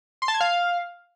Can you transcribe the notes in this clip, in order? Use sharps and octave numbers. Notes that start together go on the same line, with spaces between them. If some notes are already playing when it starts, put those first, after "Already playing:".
C6
A5
G#6
F5